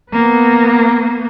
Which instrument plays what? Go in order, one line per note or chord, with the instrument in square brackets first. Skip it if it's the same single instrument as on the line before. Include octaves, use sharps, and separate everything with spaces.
[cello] A#3 B3